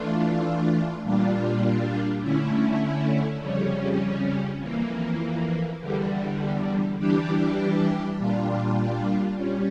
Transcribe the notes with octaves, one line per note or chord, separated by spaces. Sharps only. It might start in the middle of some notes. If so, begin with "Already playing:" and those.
Already playing: E3 A3 D4 F4
A#2 G3 D4 F4
D3 A3 C#4 E4
F2 C#3 G3 C#4
F2 E3 A#3
E2 D3 G3
E3 G3 D4 G4
A#2 G3 D4 F4
G3 C#4